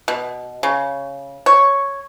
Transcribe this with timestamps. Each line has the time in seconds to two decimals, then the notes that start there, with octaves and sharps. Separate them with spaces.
0.08 B2
0.63 C#3
1.46 C#5